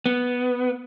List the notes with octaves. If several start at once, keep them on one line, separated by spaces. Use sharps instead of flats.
B3